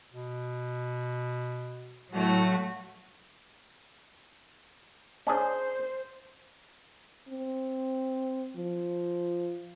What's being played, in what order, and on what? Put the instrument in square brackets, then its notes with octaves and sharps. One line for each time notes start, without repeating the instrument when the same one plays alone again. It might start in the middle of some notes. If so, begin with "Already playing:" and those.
[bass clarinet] B2
[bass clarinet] A2 [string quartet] F#3 A3 F#4
[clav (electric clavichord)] C#4 D4 G#4 [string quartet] C5
[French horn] C4
F3